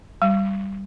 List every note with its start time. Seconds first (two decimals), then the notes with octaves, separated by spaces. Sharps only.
0.22 G3